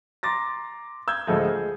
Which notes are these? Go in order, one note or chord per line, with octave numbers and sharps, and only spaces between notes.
A#5 C6 D6 A6 A#6
E6 G6 G#6
D2 A2 F3 G#3 A4 D#5
G#4